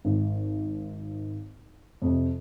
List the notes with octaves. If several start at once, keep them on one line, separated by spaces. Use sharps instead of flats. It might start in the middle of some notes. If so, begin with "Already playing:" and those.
G#1
F2 C3